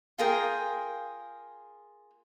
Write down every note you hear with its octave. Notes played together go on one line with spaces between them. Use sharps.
F4 G#4 A#4 G5